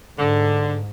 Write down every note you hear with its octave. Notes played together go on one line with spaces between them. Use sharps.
G#2 D3